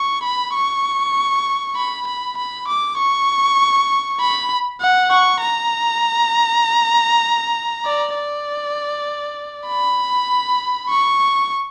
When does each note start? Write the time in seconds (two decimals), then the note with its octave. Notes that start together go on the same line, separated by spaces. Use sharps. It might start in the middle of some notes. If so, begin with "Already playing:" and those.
Already playing: C#6
0.23 B5
0.54 C#6
1.76 B5
2.07 B5
2.37 B5
2.68 D6
2.98 C#6
4.20 B5
4.81 F#5
5.11 C#6
5.41 A#5
7.85 D5
8.15 D5
9.67 B5
10.90 C#6